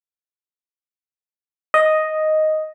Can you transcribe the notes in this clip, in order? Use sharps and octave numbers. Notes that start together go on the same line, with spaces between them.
D#5